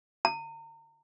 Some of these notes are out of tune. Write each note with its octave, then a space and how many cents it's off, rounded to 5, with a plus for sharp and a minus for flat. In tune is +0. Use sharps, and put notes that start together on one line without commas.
A#5 -35